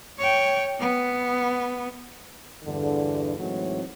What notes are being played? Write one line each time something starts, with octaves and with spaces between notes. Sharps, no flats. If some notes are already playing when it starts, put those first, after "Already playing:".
C#5 G5
B3
E2 G2 D3
A2 E3 F#3 G#3 C4 D#4